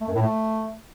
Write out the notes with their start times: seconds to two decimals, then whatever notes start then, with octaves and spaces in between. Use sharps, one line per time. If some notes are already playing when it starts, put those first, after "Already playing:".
0.01 A3
0.08 F#2
0.15 A2
0.22 A3